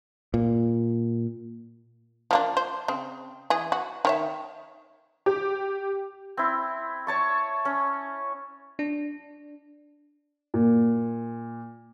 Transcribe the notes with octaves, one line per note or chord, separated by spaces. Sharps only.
A#2
F3 A#3 D4
C5
C#3 C4
E3 G#4
F#4
D#3 C#5 E5
G4
C4 E4
C#5 A5 C#6
C#4
D4
A#2